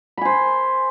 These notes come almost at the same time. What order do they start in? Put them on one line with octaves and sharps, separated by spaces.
B5 G#5 C5